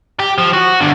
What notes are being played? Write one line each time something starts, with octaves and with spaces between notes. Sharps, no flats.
G4
F3
F#4
G2 D3